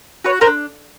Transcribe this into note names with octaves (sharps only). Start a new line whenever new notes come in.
F#4 B4 C#5
A#4 C5
D4